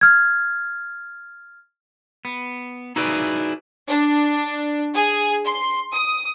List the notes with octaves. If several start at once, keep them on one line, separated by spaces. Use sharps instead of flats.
F6 G#6
B3
D#4 E4 F#4 G#4 B4 D5
D4
G#4
C6
D#6